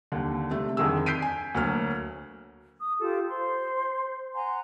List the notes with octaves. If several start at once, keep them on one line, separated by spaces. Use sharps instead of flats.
D#2 D3
C3 A3
F2 D3 D#3 G#4 E6
G6 B6 C7 D7 D#7
G#5
D2 F#3 A#3 F6
D#6
F4 G4 A4
C5 C6
F#5 G#5 A#5 C6